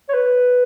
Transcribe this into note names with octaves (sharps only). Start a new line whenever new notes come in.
C#5
B4